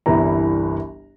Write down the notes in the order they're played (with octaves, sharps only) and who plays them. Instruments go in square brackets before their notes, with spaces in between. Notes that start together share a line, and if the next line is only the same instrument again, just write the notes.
[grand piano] G1 C2 E3 A#5